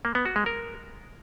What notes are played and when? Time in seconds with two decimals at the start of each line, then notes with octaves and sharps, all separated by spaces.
0.05 A#3
0.15 B3
0.25 F#4
0.36 G#3
0.46 A#4